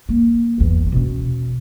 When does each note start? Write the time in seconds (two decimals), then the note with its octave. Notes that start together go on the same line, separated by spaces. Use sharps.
0.09 A#3
0.58 G1 E2
0.92 B2 C#4